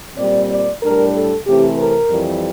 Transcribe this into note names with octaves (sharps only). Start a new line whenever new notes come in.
A#2 G3 C4 D5
D5
A2 G3 D4 A#4
A4
C3 E3 A3 C4 G4
A#4
F2 E3 G3